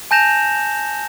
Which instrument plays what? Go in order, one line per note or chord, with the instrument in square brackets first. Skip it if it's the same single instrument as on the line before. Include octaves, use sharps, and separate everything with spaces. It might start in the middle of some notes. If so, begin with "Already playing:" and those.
[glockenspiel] G#5 A5 G6 A#6 E7 F7